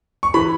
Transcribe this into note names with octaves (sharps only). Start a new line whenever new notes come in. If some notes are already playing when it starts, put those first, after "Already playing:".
C#6
E3 B5